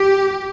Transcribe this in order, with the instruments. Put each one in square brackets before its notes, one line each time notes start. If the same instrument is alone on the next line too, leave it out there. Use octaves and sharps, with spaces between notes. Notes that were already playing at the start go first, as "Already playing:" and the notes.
Already playing: [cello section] G4